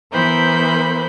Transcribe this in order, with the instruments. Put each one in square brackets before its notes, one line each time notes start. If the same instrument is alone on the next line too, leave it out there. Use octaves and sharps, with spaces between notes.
[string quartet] E3 B3 A#4 C5 B5 G6